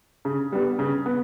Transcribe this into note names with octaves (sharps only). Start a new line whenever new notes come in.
C#3
G3 B3
C#3
B3